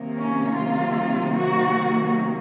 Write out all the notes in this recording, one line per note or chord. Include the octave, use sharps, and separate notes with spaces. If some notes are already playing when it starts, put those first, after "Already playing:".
Already playing: C3 D#3 F#3 A#3
C#4
F4
F#4